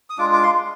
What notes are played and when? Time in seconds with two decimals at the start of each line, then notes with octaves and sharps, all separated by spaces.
0.10 D#6
0.18 G#3 D4 F4 D6
0.33 D6
0.43 C6